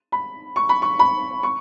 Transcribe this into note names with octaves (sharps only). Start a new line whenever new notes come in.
B5
C#6
B5
C#6
B5
C#6